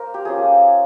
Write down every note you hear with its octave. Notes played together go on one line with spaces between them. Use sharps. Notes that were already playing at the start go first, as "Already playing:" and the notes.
Already playing: A#3 A#4 C5
G4
F3 A#3 C#4 G#4